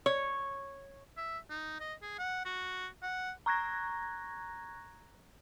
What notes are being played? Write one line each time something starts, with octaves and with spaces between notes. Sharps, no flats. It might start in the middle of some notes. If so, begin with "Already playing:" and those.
C#5
E5
D#4
D#5
G#4
F#5
F#4
F#5
A#5 C#6 F#6 G#6 A#6